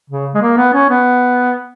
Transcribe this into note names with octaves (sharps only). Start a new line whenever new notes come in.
C#3
G#3
A#3
B3
C#4
B3